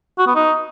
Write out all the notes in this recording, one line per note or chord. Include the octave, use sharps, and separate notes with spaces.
F#4
B3
D#4